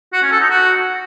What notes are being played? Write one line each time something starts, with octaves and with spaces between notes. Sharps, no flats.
F#4
C#4
A4
D#4
F#4